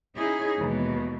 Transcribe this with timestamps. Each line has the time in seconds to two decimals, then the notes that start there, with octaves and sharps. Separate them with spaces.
0.15 C#4 D#4 E4 G#4
0.57 D#2 B2 E3 G#3 B3